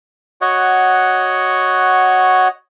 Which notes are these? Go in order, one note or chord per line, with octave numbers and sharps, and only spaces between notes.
F#4 C#5 D#5 F#5